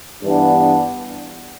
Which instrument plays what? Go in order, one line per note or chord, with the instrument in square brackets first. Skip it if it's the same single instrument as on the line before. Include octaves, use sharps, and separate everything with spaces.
[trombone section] G2 E3 B3 D4